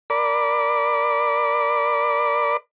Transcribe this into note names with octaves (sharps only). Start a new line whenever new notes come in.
A#4 D5 B5 D6